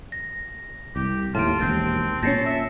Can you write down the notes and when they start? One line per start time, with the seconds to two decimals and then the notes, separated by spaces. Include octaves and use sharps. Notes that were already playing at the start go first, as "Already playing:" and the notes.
0.12 A#6
0.96 C2 G4
1.35 D#2 A2 F4 A5 D7
1.60 E1 D#2 C4
2.23 A#2 G3 C#4 A5 A#6 C7 C#7
2.46 E5